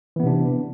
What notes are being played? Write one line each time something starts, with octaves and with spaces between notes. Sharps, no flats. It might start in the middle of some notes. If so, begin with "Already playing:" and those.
C3 E3 B3 D4